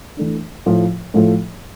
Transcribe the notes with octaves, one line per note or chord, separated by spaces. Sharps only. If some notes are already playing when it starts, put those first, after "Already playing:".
E3 A3 D4
A2 F3 A3
A2 F3 A3